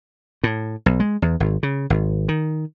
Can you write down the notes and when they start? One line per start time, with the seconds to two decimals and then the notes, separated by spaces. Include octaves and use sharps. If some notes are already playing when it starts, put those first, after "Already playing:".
0.44 A2
0.86 B1
1.00 G#3
1.22 E2
1.40 G#1
1.63 C#3
1.90 G#1
2.28 D#3